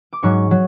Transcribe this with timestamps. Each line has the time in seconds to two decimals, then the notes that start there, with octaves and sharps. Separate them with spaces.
0.13 D6
0.23 G#2 F#3 C#6
0.51 F#3